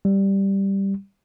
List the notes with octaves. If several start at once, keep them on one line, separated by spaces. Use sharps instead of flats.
G3